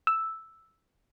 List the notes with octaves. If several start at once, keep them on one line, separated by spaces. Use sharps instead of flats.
E6